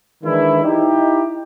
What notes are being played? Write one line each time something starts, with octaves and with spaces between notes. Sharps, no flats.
D#3 E3 G#3 D4 E4
D#4 E4 G4